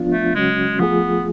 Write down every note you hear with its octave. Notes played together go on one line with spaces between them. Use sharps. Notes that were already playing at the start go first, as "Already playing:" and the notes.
Already playing: F3 B3 D4 F4
A3
C#3 F#3 G#3 C#4 F#4
F3 A3 B3 F4 G#4